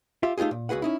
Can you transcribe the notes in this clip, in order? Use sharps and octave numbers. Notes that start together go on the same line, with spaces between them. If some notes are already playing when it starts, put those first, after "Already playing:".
F4 G4 E5
A3 D#4 F4 G4 G#4
A#2
C#2 F#4 G#4 B4 F#5
C#4 D#4 E4